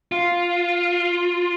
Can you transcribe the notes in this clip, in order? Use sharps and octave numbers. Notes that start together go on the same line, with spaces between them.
F4